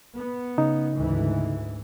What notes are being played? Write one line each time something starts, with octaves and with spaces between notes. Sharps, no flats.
B3
C#3 D#4
D2 G#2 E3